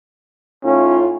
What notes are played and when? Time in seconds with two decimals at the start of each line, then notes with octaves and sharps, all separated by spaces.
0.64 A2 C#4 D#4 F4